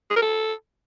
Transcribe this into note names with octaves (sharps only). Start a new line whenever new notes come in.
G#4
A#4
A4